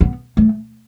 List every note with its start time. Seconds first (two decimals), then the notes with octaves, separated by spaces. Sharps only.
0.01 B3
0.37 A3